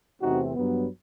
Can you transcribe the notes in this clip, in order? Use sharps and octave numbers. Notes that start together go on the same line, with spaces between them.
E2 C3 E3 A3 C4 D#4 F#4
G2 F#3 B3